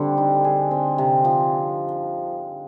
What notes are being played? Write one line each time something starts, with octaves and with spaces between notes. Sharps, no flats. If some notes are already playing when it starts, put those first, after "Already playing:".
Already playing: D3 G3 C4
D#4
G#4
C4
C3
F3